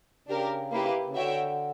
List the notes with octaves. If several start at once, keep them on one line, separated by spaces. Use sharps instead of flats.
C#3 D4 G4 A#4
A#3 E4 G4 B4
C#3
D3 F#4 C#5 E5 G5